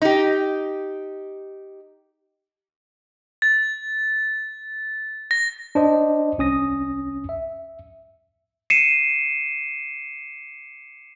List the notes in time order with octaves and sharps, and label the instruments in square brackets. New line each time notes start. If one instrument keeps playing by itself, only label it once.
[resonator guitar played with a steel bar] D#4 G4
[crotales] A6
A#6
[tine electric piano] D4 C5 D#5
C2 C#4 D#6 A#6
E5
[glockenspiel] C7 C#7 D#7 E7